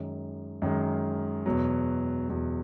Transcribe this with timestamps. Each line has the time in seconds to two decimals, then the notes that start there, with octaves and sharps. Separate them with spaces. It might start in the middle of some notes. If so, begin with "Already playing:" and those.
Already playing: F#2 D#3 G#3
0.62 F#2 D#3 G#3
1.46 E2 B2 F#3
2.29 E2 B2 F#3